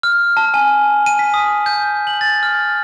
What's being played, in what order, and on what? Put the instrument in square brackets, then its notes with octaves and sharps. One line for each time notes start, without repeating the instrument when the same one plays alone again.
[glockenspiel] F6
A5
G#5
D#7
B6
D#6
G6
F#7
A6
F6